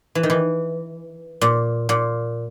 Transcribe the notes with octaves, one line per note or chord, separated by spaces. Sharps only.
E3
D#3
E3
A#2
A#2